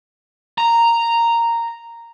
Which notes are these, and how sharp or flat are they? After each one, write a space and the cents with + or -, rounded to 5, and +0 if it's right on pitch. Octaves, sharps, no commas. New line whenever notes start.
A#5 -5